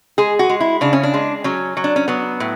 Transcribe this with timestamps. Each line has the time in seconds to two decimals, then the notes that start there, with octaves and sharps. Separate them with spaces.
0.18 G#3 G#4
0.39 F#4
0.49 G#3
0.60 E4
0.81 C#3 D4
0.93 C#4
1.03 D4
1.14 G#3
1.44 F#3 C#4
1.77 F#3
1.84 D4
1.96 C#4
2.08 F#3 B3
2.40 A2